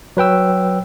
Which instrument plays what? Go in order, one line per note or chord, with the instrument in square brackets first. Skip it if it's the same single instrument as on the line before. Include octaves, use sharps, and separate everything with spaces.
[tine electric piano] F#3 B4 G5 E6